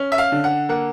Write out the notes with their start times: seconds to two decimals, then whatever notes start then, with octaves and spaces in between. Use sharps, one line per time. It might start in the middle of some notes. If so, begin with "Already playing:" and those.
Already playing: C#4
0.12 E5
0.18 F5
0.32 D3
0.44 F#5
0.69 A#3 F#5